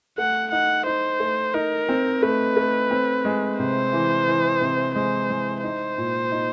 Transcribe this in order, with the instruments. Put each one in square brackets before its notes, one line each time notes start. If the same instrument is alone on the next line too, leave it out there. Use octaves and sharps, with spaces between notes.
[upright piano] A3 [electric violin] F#5
[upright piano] D#4 [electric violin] F#5
[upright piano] D#4 [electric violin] C5
[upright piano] A3
[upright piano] D#4 [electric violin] A#4
[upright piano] C4
[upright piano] A3 [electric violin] B4
[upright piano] A3
C4
G#3
[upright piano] C3 [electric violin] C5
[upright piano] E3
E3
C3
[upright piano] G#3 [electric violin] C5
[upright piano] G#3
[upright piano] D#4 [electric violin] C5
[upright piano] A#2
D#4